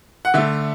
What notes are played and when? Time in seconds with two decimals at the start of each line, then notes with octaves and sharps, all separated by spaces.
0.25 F#5
0.34 D3 A3 E5